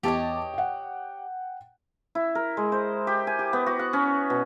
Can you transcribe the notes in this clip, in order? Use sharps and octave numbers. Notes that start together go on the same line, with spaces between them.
E2 G4 C#5 D#5 A5 D6
F#5 G5
E4
A#4
G#3
C5
G4
G#5
G4
B3
F#4
F#5
C#4
B2